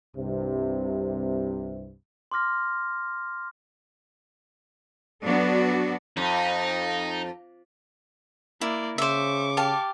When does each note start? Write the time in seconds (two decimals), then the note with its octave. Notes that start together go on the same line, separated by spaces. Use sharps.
0.15 C2 G2 C3
2.32 C6 D6 F6 A#6
5.24 F#3 B3 D4 F#4 A4 D5
6.17 F2 D#4
8.61 A#3 E4 D5
8.98 C#3 C5 E5 C#6 D6
9.57 G4 F5 A5